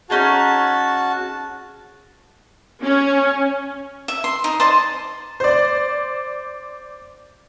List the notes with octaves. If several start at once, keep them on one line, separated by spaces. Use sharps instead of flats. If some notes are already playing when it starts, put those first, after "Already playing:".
C#4 D#4 F#4 G#4 A5
C#4
E5
C6
D#4
C5 D5 D#5 A5
C5 D5